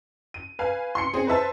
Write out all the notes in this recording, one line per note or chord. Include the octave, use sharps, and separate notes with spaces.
D#7
B4 F5 G#5
C6 C7 C#7
C4 G#4
B4 C5 E5 A5